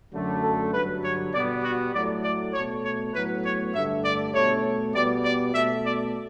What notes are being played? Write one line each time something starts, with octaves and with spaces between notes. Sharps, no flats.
F#2 D3 F#3 A3
A4
G2 D3 F#3 B4
C#5
B2 G3 B3 D5
F#4
A2 F#3 A3 D5
D5
B2 A3 C#5
C#5
A2 F#3 B3 B4
C#5
G2 D3 A3 E5
D5
B2 A3 C#5
B2 G3 B3 D5
D5
B2 A3 E5
D5